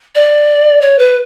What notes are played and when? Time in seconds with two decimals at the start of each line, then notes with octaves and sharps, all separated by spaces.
0.15 D5
0.81 C#5
0.98 B4